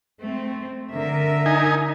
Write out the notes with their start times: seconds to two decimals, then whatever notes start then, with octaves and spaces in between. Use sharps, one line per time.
0.20 A3 C4
0.94 D3 A#4 E5
1.46 D#4 G#5